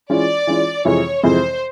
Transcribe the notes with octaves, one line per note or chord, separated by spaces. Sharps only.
E3 G#3 C#4 F4 D5
E3 G#3 C#4 F4
F2 C3 E3 G#3 C#5
F2 C3 E3 G#3 C5